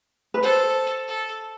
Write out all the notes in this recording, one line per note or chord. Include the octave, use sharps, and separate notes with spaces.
B4
A4 C5
A4